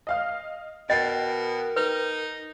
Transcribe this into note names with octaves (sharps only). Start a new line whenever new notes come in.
D#5 F5 F6
B2 A#4 D#5 G5 C7
D#4 B4